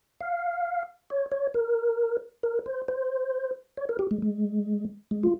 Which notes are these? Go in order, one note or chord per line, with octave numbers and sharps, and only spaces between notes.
F5
C#5
C#5
A#4
A#4
C5
C5
C#5
A#4
G4
G#3
G#3
G#3
F4